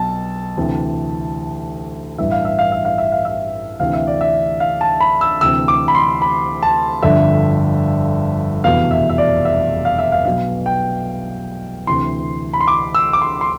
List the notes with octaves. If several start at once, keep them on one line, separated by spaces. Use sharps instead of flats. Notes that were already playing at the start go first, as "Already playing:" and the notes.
Already playing: B1 B2 A5
D2 C3 E3
A1 G2 E3 E5
F5
E5
F5
E5
F5
E5
F5
E5
D2 C3 E3 F5
E5
D5
E5
F5
A5
B5
E6
D2 C3 E3 E6
D6
B5
C6
B5
A5
G1 F2 D3 E5
F1 E2 B2 F5
E5
E5
D5
E5
F5
E5
F5
B1 B2 F5
G5
D2 C3 E3 C6
B5
C6
D6
E6
D6
C6
C6